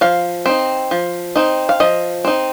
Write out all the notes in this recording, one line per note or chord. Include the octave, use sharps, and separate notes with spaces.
F3 F5
C4 D#4
F3
C4 D#4
F5
F3 D#5
C4 D#4